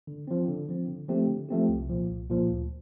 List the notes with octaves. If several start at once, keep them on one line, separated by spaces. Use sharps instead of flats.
D3
F3 C4
D3
F3 C4
D3
F3 A3 C4 G4
D3
F3 A3 C4 G4
C2
A#2 F3
C2
A#2 F3
D2